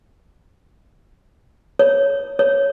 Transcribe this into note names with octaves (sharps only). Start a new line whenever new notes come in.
C#5
C#5